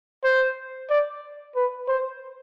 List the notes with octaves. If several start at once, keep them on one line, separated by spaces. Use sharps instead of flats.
C5
D5
B4
C5